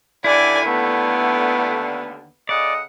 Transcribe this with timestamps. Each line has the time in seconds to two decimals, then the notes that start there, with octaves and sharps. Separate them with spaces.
0.24 D#2 D3 E4 D5 G#5
0.66 A3 B3
2.49 C#3 A4 D5 D#5 F#5